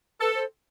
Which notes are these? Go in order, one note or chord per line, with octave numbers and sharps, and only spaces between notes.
A4 B4
C5